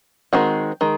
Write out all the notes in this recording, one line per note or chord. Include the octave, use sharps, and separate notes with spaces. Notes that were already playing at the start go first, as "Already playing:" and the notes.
D#3 G#3 C4 F#4
D#3 G#3